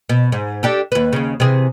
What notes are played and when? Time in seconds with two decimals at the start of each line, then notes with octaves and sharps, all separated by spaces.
0.09 B2
0.32 G#2
0.63 D4 G4 A4
0.92 D#2 B4
1.13 D#2 C#3
1.40 C3 E3 G#4